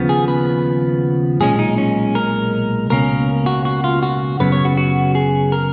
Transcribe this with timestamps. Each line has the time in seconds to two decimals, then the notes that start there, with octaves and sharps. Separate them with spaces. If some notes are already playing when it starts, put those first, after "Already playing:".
Already playing: D#2 C#3 F3 B3
0.09 G#4
0.28 B4
1.40 B1 A#2 G#3 C#4 G#4
1.59 D#4
1.78 C#4
2.15 A#4
2.90 C#2 B2 A#3 C#4 A#4
3.46 F#4
3.65 F#4
3.84 F4
4.03 F#4
4.40 F#2 C#3 F#3 B3 B4
4.52 C#5
4.65 F#4
4.77 F#4
5.15 G#4
5.52 A#4